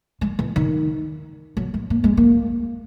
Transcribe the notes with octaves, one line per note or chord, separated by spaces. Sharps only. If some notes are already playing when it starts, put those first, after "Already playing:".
G#3
E3
D#3
F#3
G#3
A#3
G#3
A#3